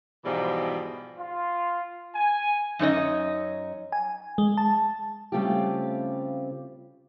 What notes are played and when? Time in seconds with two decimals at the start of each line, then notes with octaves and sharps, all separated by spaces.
0.25 G#2 B2 E3 F3 G3
1.18 F4
2.15 G#5
2.79 F#2 D#4 C#5 D#5
3.92 G#5
4.38 G#3
4.57 A5
5.32 C#3 G3 A3 C4 F4 G4